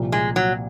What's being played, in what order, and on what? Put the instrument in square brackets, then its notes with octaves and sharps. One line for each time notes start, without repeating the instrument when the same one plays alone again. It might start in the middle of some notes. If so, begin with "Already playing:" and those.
Already playing: [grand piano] C2 A#2 F3
[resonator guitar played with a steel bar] G#3
F#3